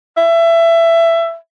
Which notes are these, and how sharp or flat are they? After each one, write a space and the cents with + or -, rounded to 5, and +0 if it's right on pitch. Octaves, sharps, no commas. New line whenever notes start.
E5 +20